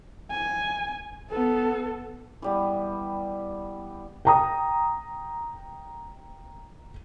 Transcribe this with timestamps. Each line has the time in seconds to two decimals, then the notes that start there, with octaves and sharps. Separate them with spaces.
0.31 G#5
1.30 B3 A4
2.42 E3 G3 B3
4.25 G5 A#5 D#6